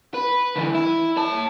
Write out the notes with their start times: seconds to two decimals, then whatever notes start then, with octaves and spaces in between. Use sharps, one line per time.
0.14 B4
0.56 D3 E3
0.75 E4
1.17 C#5 A5